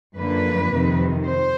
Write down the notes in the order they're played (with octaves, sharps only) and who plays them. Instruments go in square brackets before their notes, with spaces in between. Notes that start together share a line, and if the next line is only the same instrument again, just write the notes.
[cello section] F#2 D3 F3 A#3 B4
F2 C3 D#3
C5